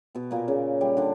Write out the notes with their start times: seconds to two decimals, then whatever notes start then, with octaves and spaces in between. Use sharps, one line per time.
0.15 B2 B3
0.31 A#2 A#3
0.48 C#3 C#4
0.81 G3 G4
0.97 D3 D4